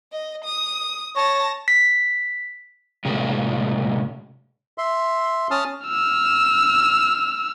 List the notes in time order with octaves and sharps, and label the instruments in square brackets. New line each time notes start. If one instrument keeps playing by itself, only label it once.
[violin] D#5
D#6
[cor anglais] C#5 [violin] A5 A#6
[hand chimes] B6
[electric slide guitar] A2 C3 G#3 A#3 C#4 F#4
[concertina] E5 C6
C#4 A5 D#6 F6
[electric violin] E6 F6